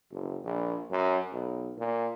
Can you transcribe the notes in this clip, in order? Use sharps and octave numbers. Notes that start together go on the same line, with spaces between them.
F#1
A#1
F#2
B1
A#2